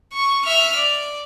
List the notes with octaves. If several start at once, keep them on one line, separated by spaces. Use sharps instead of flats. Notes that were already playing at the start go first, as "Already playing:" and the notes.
C#6
E5 F6
D5